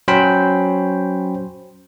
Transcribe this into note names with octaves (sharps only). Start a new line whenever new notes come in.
F#3 C#4 C5 G5 B5